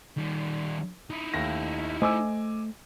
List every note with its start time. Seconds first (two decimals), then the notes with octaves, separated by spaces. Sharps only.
0.17 D#3 G3
1.10 D#4 E4
1.34 D#2 A3 A#6
2.02 A3 C5 D#5 G#5 D6 E6